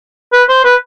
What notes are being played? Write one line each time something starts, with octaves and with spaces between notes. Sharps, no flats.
B4
C5
B4